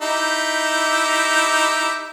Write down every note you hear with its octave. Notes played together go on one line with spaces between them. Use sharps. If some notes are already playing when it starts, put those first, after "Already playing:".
D#4 E4 G4